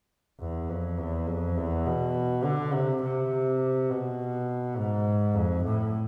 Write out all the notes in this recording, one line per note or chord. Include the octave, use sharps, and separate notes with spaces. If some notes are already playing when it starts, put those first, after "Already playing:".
E2
F2
E2
F2
E2
B2
D3
C3
C3
B2
G#2
F2
A2